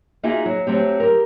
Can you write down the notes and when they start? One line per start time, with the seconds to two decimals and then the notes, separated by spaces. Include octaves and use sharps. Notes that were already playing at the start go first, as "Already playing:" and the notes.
0.23 A#3 D#4 F4 F#4 G#4 E5
0.46 F#3
0.67 F#3 A3 C4 G4
1.00 G4 A#4